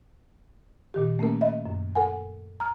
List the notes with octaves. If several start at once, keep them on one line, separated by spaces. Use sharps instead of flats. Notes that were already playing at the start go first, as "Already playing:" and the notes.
A#2 D#3 G4
A3 A#3 C#4 A#4
D#5 E5
F#2
A4 A#4 F#5 G#5
A#5 F6